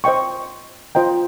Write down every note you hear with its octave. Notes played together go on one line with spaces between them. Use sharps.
C5 D#5 G5 C#6
F4 C5 D#5 G5 A#5